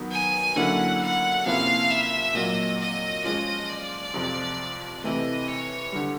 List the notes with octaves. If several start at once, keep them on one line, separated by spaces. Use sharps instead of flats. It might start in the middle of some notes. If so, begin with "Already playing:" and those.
Already playing: D#3 F#3 B3
G#5
D3 F#3 A#3 C#4 E4 F#5
F#5
C3 F3 A#3 C#4 E4 F5
E5
A#2 F#3 A#3 D#5
D#5
F3 G#3 C#4 F4 D#5
D5
F2 C3 F3
C3 E3 A3 D#5
C#5
D3 G3